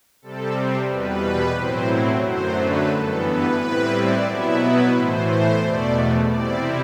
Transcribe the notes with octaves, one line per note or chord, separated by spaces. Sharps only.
C3 G3 C4 A4
E2 B2 G3 B4
A2 F#3 C4 E4 C5
F#2 D3 F#3 A3 C5
B4
G2 E3 B3 A4
B4
A2 G3 C4 E4 B4
D5
B2 F#3 B3 E4 E5
B4
A2 E3 A3 C5
C5
E2 B2 A3 D5
C3 G3 C4 E4 D5